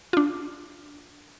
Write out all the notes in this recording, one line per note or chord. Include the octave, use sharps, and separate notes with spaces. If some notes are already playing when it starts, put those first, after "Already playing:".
D4 F4